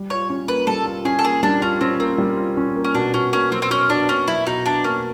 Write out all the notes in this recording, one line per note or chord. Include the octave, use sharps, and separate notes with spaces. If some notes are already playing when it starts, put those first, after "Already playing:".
Already playing: G3
F4 C#5
C#4
A#3 B4
G3 A4
F4
C#4 G#4
A4
A#3 G#4
G3 D4
C#4 F4
C4 C#4
A#3 C4
G3
F4
C#4
A#3
C#4
B2 D4
B2 C#4
A#3 C#4
F#3 C4
C4
B2 C#4
B2 D4
A#3 C#4
F#3 E4
B2 D#4
B2 D4
A#3 C#4